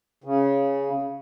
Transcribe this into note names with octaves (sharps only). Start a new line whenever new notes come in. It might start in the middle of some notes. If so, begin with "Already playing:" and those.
C#3